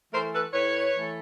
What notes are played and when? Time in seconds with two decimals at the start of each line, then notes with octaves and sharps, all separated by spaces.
0.11 E3 A3 A#4 C5
0.32 A4 B4
0.52 A2 B4 C#5
0.95 E3 A3